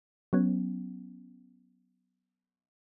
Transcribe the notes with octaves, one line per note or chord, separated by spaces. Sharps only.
F#3 B3 C#4